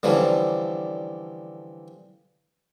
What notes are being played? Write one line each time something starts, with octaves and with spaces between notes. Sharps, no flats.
D3 E3 F3 G3 C#4